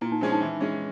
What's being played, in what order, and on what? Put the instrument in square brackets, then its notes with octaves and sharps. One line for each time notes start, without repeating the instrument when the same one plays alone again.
[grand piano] A#2 [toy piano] E4
[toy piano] D#4
[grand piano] F3 G#3 C#4 [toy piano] D4
[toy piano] D#4
[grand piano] E3
G#3 C#4